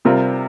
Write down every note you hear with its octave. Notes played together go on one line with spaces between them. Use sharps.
C3 G3 C4 F4 A#4